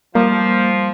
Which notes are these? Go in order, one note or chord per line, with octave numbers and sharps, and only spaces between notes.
F3 G3 A#3